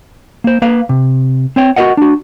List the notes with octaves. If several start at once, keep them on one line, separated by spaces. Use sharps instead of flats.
A#3 C5
A#3 B4 F5
C3
C4 C#5 G5
F#4 G4 A#4 D#5 F#5
D4 F#4